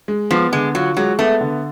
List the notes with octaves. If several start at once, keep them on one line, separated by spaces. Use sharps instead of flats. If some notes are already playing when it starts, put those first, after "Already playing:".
G#3
F3 B3
D3 G#3
F#3 F4
F#3 G#3
A3 B3
D3